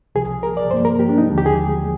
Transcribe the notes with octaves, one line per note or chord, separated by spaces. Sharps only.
C2 C3 F3 G#4
A#4
D5
G2 F3 A#3 C5
A#4
G4
D4
D#4
D#2 D3 F3 G#3
G4
G#4